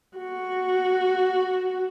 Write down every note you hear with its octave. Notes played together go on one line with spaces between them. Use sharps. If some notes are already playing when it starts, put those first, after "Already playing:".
F#4